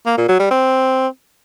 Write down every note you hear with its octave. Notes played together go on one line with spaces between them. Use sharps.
A#3
A#2
F#3
G3
C4